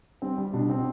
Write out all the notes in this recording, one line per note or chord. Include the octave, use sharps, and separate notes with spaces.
G3 C4
G3
B2 D4
B2 C4